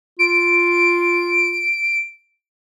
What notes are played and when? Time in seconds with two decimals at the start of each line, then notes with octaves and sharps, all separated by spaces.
0.19 F4 D7